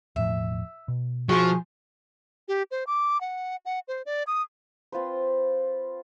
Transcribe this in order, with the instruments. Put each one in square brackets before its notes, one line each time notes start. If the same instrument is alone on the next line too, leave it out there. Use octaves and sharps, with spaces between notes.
[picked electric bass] E1 A2 F3 [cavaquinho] E5
[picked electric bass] B2
[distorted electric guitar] F3 [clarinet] F#4 [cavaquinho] G#4 C6 C#6
[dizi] G4
C5
D6
F#5
F#5
C5
D5
D#6
[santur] C4 F4 B4 C5